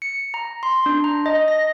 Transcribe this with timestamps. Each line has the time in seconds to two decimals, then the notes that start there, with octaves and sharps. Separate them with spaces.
0.02 C#7
0.34 A#5
0.63 C6
0.86 D4
1.04 A#5
1.26 D#5
1.48 A#6